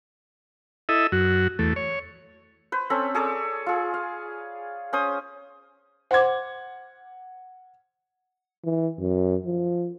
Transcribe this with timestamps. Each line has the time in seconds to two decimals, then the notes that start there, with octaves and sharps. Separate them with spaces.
0.89 E4 A4 D#5 E5
1.12 F#2 F#4
1.59 E2 A3
1.76 C#5
2.72 B4 C5
2.90 C4 C#4 A4 B5
3.15 G#4 A4 C#5 D5
3.66 F4 G#4
3.94 F5
4.93 C#4 C5 D#6
6.11 C5 F#5 C6 D6 G#6
8.65 E3
9.00 F#2
9.46 F3